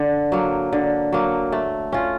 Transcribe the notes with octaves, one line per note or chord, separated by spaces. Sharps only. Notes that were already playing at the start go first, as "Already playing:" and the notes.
Already playing: D3
F#3 A#3
D3
F#3 A#3
A3
C#4 F4